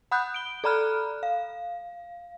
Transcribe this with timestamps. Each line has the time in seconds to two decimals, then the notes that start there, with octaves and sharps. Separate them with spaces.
0.11 F#5 B5 D#6 F#6 G6
0.34 D7 G7
0.64 A4 D5 A#5 B5 F6 F#6
1.23 F5